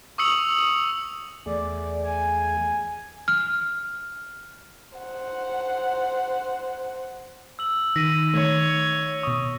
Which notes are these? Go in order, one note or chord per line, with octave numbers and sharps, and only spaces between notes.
C#6 D#6 E6 C#7 F#7
E2 A3 G#4 D5
G#5
F6
C5 F#5
E6 F#7
D#3 A#6 B6 D#7
D#3 A3 C#5
B2 C#6 D#6